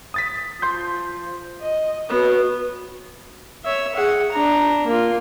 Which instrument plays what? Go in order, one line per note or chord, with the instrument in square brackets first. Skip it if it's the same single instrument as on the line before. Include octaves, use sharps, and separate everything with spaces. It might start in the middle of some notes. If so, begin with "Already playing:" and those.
[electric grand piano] D#6 A6 B6
[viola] F3 [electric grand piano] C6 G6
[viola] D#5
[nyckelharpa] B3 [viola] F#4 C#5
[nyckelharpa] C#5 E5
G#4 F#5
D4 A#5
A#3 F4